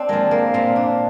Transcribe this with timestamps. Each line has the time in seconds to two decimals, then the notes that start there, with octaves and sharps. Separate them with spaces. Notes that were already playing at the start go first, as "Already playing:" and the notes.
Already playing: C4 D4
0.09 F3 G#3 A#3
0.31 A#3
0.54 A#2 C4
0.76 D4